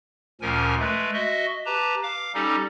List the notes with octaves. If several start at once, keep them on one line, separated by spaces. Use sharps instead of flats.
D2 A#2 F3 C#4 A#4 G#5
G#3 A3 B4
F#4 D#5 E5
G4 B4 A5 A#5
F5 D6
G3 C#4 D#4 G4 A4